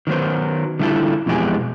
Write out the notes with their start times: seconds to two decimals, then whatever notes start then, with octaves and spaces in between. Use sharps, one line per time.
0.07 D#3 F#3 B3 C5
0.79 D3 G3 E4 F4 A4
1.26 F2 B2 E3 G#3 G4 G#5